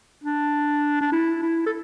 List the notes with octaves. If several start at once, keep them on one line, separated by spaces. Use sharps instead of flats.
D4
D4
E4
E4
A4